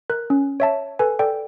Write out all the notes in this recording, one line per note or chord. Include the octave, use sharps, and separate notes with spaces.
A#4 F#6
C#4
C#5 E5 A5
A4 B4 G#5
A4 D5 G5